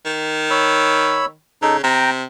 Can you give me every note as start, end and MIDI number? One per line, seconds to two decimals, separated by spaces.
0.05 1.37 51
0.51 1.26 73
0.51 1.26 83
0.51 1.26 88
1.62 1.83 49
1.62 1.77 63
1.62 1.77 69
1.84 2.24 48
1.84 2.10 79
1.84 2.10 82